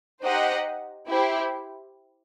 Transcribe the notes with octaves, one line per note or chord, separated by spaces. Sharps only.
D#4 G4 C5 D#5 F#5
E4 G4 C5